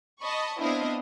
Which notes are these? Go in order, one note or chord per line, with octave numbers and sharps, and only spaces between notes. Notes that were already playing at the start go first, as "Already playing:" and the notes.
D#5 A5 B5 C#6
B3 C4 D4 E4 D#5 F5